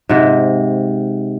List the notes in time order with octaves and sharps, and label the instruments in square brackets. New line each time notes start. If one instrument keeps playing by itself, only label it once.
[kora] G#2 C3